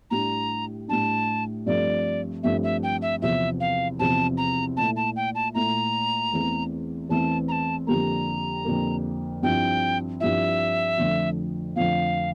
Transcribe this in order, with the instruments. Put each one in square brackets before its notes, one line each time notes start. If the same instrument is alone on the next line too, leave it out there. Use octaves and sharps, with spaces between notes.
[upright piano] A2 G3 D4 [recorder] A#5
[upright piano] A2 G3 D4 [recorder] A5
[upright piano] G2 F3 A3 C4 [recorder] D5
[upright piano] G2 F3 A3 C4 [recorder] E5
[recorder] E5
G5
E5
[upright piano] E2 C3 F3 C4 [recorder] E5
[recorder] F5
[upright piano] E2 C3 F3 C4 [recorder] A5
[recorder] A#5
[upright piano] A#2 A3 E4 [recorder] A5
[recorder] A5
G5
A5
[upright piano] A#2 A3 E4 [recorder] A#5
[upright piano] E2 E3 A3 C4
[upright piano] E2 E3 A3 C4 [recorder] A5
[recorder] A#5
A5
[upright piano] F2 D3 G3 A#3 [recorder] A#5
[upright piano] F2 D3 G3 A#3
[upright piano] G2 F3 C4 E4 [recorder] G5
[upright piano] G2 F3 C4 E4 [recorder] E5
[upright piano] F2 D3 F3 A3
[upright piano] F2 D3 F3 A3 [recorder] F5